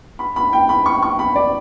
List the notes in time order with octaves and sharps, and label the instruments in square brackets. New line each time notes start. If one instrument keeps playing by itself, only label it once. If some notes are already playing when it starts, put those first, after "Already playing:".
[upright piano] B5
B5
G5
B5
C#6
C#6
B5
D5